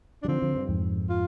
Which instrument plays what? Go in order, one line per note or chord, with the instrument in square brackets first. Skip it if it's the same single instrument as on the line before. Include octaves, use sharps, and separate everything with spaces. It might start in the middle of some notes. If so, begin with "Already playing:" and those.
[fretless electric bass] G3 [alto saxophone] D4
[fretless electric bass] D3 F3 [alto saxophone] C4
[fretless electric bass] D3 F3
G2
F2 G#2
[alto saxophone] F4